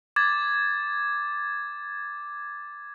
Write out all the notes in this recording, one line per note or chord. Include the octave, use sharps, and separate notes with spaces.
D6 G#6 A6